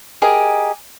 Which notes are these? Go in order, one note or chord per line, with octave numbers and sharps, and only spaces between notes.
G4 G#4 A#4 D#5